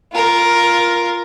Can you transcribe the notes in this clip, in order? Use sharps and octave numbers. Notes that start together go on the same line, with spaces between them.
F4 A#4